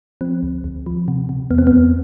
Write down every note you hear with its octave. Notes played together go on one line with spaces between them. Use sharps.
F3 C4
D2
D2
F3
C3
C3
E2 B3
C4
E2 B3